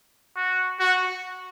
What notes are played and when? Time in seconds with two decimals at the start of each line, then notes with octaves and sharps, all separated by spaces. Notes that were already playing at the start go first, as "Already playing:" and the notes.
0.37 F#4
0.80 F#4